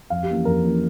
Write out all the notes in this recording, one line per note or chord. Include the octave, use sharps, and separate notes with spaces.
F2 F5
G4
E3 A#3 C#4
F2 A#4
E3 A#3 C#4